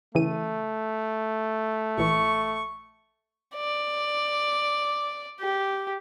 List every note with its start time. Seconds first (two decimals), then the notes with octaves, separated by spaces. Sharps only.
0.15 C#3 E3 A3 D#7
1.98 A#1 E3 C#6
3.56 D5
5.40 G4